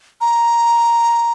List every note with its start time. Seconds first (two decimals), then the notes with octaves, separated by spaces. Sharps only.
0.21 A#5